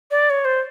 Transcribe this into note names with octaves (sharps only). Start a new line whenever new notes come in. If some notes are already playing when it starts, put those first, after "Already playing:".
D5
C#5
C5